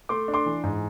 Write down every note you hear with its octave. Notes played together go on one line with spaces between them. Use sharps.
A3 C6 D6
D4
C6 D6
E3
G#2